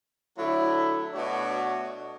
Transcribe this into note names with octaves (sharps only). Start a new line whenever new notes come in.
D3 F#3 A3 E4
B2 A3 D4 F#4 C#5